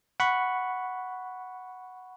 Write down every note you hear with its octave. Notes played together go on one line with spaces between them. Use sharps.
F#5 B5 C#6